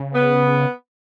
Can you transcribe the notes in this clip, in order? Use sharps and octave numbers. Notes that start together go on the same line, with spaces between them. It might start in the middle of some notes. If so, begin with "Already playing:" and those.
Already playing: C#3
B3